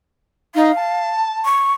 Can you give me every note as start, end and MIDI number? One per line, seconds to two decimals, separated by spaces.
0.55 0.72 63
0.55 1.11 77
0.76 1.43 81
1.45 1.73 85